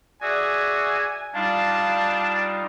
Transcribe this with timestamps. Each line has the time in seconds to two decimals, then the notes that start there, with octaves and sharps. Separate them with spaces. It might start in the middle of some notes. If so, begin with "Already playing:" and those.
0.22 F#4 G#4 D5 E5 G#5
1.35 G3 D4 D#4 F4 F5 A5